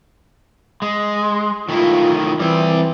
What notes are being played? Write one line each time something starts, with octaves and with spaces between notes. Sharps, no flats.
G#3
D#3 A3 E4 F4
E3 G3 C4